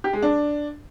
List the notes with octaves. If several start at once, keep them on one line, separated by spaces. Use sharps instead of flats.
G4
G#3
D4